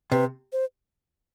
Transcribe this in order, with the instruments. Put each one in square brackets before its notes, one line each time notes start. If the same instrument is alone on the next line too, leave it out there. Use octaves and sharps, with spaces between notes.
[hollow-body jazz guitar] C3 [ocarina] B4
[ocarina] C5